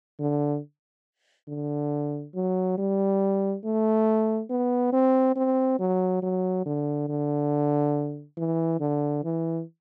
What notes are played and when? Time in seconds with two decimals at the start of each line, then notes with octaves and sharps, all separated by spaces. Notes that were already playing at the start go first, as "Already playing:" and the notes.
0.19 D3
1.48 D3
2.35 F#3
2.78 G3
3.64 A3
4.50 B3
4.93 C4
5.36 C4
5.79 F#3
6.22 F#3
6.66 D3
7.09 D3
8.37 E3
8.80 D3
9.24 E3